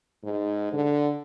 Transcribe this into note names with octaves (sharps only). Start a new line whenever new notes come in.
G#2
D3